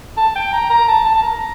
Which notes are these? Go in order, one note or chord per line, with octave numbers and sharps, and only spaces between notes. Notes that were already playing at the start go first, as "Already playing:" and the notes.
A5
G5
A#5
A#5
A5
A5
A5
A#5